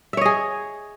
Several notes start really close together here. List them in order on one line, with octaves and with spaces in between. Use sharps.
E5 C#5 D#5 G#4